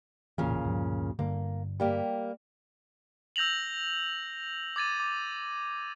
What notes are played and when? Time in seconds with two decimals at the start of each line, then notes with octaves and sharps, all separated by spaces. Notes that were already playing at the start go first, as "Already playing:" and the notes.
0.38 E1 A1 A#2 C#3 E3
0.65 D2 G2 F3
1.19 G2 D3 A#3
1.80 G3 A#3 G4
3.36 E6 G6 A#6 F7 F#7
4.76 D6 G#6 A6 D#7
5.00 D6